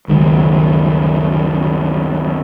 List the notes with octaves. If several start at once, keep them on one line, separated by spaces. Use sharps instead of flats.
C#2 F#2 D#3 G#3